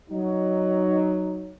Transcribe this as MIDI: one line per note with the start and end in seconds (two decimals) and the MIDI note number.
0.10 1.54 54
0.10 1.54 63